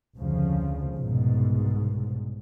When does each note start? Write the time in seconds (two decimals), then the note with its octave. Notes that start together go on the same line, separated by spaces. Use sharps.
0.16 F1 D2 C#3 F3
0.95 C2 G#2 B2